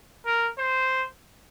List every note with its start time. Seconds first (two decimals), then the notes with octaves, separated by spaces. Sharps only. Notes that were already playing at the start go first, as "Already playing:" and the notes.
0.26 A#4
0.59 C5